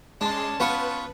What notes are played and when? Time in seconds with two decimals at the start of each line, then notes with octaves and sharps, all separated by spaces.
0.21 G#3 C#4 D4 A5 C6
0.60 B3 F4 B4 C#6